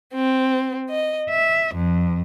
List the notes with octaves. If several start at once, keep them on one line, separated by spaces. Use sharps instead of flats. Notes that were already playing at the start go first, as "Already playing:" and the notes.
C4
D#5
E5
F2